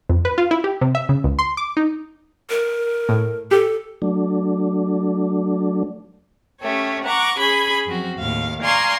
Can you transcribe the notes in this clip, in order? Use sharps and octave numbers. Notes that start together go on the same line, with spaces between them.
F2
B4
F4
E4
G4
C3
E5
C#3
C#2
C6
D6
D#4
A#4
A2
G4 A4
F#3 A3 D4
A3 C#4 G4 C#5
F#5 A#5 C#6 D6
C#4 G#4 B5 G#6
F#2 F3 C4 F#4
D#2 A2 F5
D5 F5 G#5 A#5 C6 C#6